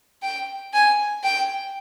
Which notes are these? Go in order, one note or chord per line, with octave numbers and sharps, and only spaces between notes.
G5
G#5
G5